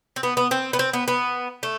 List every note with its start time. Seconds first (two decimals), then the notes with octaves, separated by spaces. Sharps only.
0.16 C4
0.23 B3
0.37 B3
0.51 C4
0.73 B3
0.79 C4
0.93 B3
1.08 B3
1.63 A3